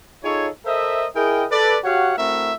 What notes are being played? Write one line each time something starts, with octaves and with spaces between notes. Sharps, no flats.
D#4 F4 G#4 A4 C#5
A4 A#4 C5 D#5 E5
E4 G#4 A#4 D#5 G5
A4 B4 D5
F#4 G4 C#5 F5 F#5
A3 C4 E4 F#4 A#4 E5